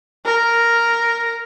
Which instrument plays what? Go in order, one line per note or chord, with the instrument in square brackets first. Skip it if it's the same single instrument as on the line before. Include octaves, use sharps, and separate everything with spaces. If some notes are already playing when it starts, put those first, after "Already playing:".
[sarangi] A#4